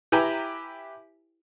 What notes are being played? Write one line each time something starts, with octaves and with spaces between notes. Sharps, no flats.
E4 G4 B4 G5 G#5 A#5